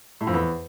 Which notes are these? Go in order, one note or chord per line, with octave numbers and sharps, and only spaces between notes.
A2
F2
E2